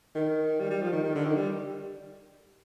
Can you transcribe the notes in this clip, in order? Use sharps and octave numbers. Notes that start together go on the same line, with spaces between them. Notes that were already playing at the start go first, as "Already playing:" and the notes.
D#3
G3
G3
F3
D#3
D#3
D3
D#3
G3